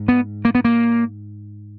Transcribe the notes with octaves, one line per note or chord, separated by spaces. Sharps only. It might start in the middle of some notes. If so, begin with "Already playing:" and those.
Already playing: G#2
B3
A#3
B3
A#3